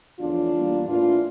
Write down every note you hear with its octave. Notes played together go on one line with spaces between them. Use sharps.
E2 C#3 F3 A3 D4 F4
E2 E3 G3 A#3
A2 E3 A#3 D4 F4